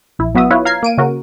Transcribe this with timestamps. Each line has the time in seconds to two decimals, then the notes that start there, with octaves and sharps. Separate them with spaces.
0.19 A#1 E4
0.35 F#3 B3 F#4 E5 D#6
0.51 E4 F4 B4 C#5
0.65 F5 A#5 G#6 C7
0.83 A#3 D7 D#7
0.98 C#3 F#4 A#4